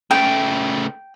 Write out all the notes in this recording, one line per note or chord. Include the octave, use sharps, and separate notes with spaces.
C#3 A3 G5